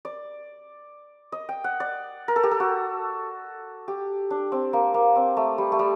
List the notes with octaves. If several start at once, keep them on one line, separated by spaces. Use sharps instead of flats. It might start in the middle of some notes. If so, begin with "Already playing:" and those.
D5
D#5
G5
F#5
D5
A#4
A4
G4
A4
F#4
G4
D4
C4
A#3
A#3
C4
A3
G3
A3
G3